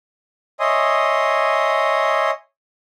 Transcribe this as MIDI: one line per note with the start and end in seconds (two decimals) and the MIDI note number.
0.60 2.31 73
0.60 2.31 75
0.60 2.31 76
0.60 2.31 80
0.60 2.31 84
0.60 2.31 87